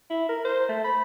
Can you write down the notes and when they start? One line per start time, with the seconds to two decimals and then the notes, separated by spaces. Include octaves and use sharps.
0.10 E4
0.29 A#4
0.45 C5
0.69 A3
0.84 B5